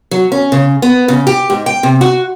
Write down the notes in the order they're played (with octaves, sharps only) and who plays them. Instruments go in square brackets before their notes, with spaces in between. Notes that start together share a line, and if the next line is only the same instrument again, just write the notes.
[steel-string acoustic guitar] F#3
C#4
C#3
B3
C#3
G4
G#2
G5
C3
F#4